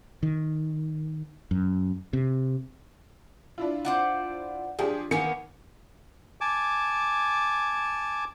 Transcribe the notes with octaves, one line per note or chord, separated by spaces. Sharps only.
D#3
F#2
C3
D4 E4 F4
C5 D5 F#5
F3 D4 G4 G#4
D#3 A#3 B3 G#4 C#7
G#5 A5 D6